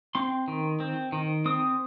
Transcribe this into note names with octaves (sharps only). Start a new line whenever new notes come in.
C4 C6
D#3
C4
D#3
C4 D#6